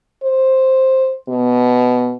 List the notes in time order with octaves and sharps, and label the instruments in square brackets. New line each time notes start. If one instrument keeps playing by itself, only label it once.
[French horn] C5
B2